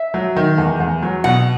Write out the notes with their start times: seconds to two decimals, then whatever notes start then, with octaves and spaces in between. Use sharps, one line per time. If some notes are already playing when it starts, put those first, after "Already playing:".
Already playing: E5
0.14 F#3
0.36 D#3
0.58 E2
0.80 E2
1.02 F#3
1.24 B2 F#5